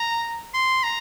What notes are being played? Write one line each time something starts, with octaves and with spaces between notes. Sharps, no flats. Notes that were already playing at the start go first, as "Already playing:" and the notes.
Already playing: A#5
C6
A#5